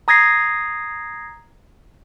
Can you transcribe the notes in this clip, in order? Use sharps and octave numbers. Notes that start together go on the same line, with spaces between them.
A#5 D#6 G#6 A#6 C7